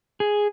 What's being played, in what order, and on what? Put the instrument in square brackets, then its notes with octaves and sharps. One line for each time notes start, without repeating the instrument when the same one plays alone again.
[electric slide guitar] G#4